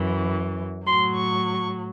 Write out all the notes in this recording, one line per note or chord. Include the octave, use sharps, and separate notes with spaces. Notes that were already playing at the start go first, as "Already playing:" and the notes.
Already playing: F#2 E3
A2 F#3 C6
C#6